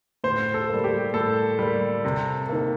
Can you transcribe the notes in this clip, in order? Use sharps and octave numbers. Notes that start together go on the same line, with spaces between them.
A2 C5
A4
G3 A#3
G4
A2 A4
G3 A#3
C3
D#3 A#3